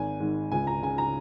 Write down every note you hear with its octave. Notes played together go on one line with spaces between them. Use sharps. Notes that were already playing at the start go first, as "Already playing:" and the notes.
Already playing: G#1 G#5
G#2 D#3
C#2 G#5
A#5
C#3 G#5
A#5